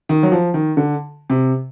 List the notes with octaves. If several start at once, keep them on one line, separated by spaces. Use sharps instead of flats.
D#3
F#3
F3
D#3
D3
C3